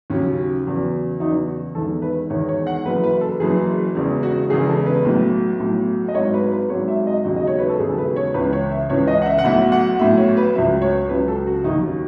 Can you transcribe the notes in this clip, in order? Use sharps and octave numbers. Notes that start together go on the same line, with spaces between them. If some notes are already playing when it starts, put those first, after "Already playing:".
D#2 C#3 F#3 C#4
E2 C#3 F#3
E2 C#3 F#3 D#4
F#4
E1 E2 D#3 A4
B4
E1 E2 D#3 C#5
C#5
F#5
F#1 F#2 E3 B4
B4
A4
F#1 F#2 E3 G#4
E1 E2 C#3
F#4
E1 E2 C#3 G#4
A4
B4
B1 A2 F#3
B1 A2 F#3
D#5
G#1 G#2 F#3 C#5
B4
B4
G#1 G#2 F#3 C#5
E5
D#5
E1 D#2 C#3 F#3 F#4
D#5
C#5
B4
A4
E1 D#2 C#3 F#3 G#4
A4
B4
C#5
C#2 C#3 E3 B4
C#5
E5
C#2 C#3 E3 C#5
D#5
F#5
E5
F#5
B1 A2 F#3 E5
F#5
B1 A2 F#3 E5
C#5
B4
C#2 C#3 F#3 E5
C#5
C#2 C#3 F#3 B4
A4
F#4
D#2 D#3 F#3 D#4
C#4